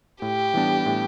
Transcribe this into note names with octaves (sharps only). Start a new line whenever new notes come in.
A2 G4
E3 G3 B3 D4
A2